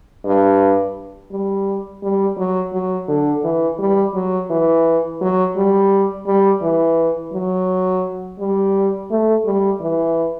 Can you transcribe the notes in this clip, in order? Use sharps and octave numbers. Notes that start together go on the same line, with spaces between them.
G2
G3
G3
F#3
F#3
D3
E3
G3
F#3
E3
F#3
G3
G3
E3
F#3
G3
A3
G3
E3